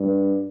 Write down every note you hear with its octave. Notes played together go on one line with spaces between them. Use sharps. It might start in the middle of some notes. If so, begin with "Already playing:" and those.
Already playing: G2